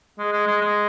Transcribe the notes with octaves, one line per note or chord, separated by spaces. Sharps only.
G#3
G#3
G#3
G#3